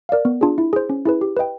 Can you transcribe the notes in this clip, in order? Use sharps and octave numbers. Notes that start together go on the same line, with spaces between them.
A#4 D5 F5
B3
D4 F4 G#4
E4
G#4 C5
C#4
E4 G#4 B4
G4
B4 D#5 G5